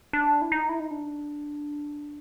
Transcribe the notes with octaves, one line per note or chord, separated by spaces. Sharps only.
D4
E4
D#4
E4
D#4
D4